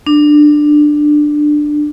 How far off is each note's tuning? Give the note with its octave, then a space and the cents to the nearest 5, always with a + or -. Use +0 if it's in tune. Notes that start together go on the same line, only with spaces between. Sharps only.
D4 +15